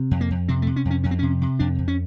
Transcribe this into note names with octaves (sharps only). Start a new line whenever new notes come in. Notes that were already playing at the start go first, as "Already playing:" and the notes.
Already playing: C3
F2
A#3
F2
C3 C4
A3
C3
C#4
F2
C#4
F2 C#4
C4
C3 C#4
C3
F2 D4
F2
C#4